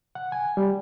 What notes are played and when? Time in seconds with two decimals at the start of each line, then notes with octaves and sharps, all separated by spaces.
0.15 F#5
0.32 G#5
0.57 G3